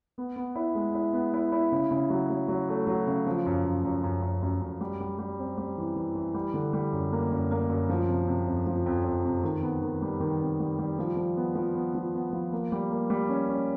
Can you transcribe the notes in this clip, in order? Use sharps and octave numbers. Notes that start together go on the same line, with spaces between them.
B3
B3
E4
G#3
E4
B3
E4
E4
C#3
C#3
F#3
F#3
F#3
A3
F#3
C#3
F3
F#2
F#2
F#2
F#2
F#2
F#2
F#2
G3
G3
G3
C4
G3
E3
E3
E3
G3
D3
G3
F#2
A#3
F#2
A#3
F#2
F3
C3
C3
F2
F3
F2
F2
C3
D#3
B3
D#3
G3
D#3
C3
G3
G3
F3
F3
B3
F3
B3
F3
B3
F3
A#3
G3
A#3
G3
C#4
C#4